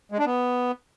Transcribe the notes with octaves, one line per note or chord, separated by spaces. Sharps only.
G#3
D4
B3